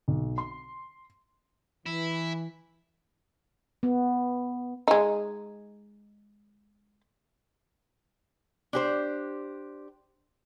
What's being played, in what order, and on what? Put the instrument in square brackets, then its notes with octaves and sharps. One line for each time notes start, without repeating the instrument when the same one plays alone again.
[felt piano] B1
C6
[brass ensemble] E3 [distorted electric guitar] E4
[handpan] B3
[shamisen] G#3 D#4
[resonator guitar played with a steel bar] D4 G4 C5